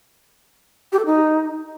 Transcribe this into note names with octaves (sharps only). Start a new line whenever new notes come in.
G4
A4
D#4